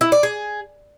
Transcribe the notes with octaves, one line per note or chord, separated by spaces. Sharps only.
E4
D5
G#4